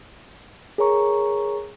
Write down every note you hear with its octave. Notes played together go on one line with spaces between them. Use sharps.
G#4 A#4 C#5 A#5 C#6